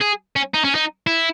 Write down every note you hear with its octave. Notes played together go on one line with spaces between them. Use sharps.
G#4
C#4
D#4
C#4
D#4
E4